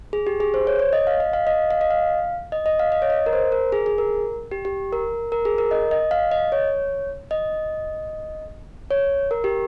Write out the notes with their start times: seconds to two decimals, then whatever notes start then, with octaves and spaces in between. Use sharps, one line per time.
0.13 G#4
0.27 G4
0.40 G#4
0.54 C5
0.67 C#5
0.79 C#5
0.93 D#5
1.07 F5
1.20 D#5
1.33 F5
1.47 D#5
1.71 F5
1.81 D#5
1.91 F5
2.52 D#5
2.66 D#5
2.79 F5
2.92 D#5
3.02 C#5
3.10 D#5
3.26 A#4
3.33 C5
3.52 A#4
3.72 G#4
3.86 G#4
3.98 A#4
4.51 G4
4.65 G4
4.93 A#4
5.32 A#4
5.45 G#4
5.58 A#4
5.71 D#5
5.91 D#5
6.11 F5
6.31 D#5
6.52 C#5
7.31 D#5
8.91 C#5
9.31 A#4
9.44 G4